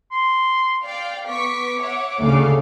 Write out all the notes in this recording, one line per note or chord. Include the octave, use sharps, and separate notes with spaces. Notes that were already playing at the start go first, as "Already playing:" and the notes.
C6
D5 F5 G5
B3 C#6 D6 B6
C#5 E5 F#5
D2 C#3 A4 F5